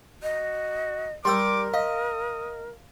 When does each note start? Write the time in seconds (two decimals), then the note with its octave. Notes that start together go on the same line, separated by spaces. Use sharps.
0.23 F#4 D#5
1.25 G3 A#4 G5 C6 D6 E6
1.74 D#5 F5 D#6